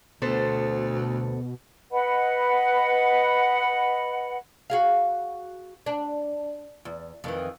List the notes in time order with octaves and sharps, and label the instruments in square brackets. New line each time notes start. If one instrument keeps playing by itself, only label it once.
[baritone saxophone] D2 [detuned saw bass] B2 [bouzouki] B3 A4 C5
[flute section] B4 D#5 F#5 B5
[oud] F#4 G#4 F5
D4
E2
F2 D#3 E3